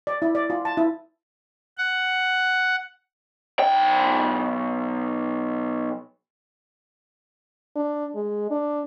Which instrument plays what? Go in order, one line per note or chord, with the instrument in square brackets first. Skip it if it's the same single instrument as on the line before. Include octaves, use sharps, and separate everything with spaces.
[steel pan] D5
E4
D5
F4
A5
E4
[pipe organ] F#5
[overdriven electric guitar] B1 G5
[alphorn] D4
G#3
D4